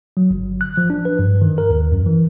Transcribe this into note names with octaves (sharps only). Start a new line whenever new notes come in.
F#3
G1
F#6
F3
D4
B4
G2
D#3
A#4
D#2
F#2
E3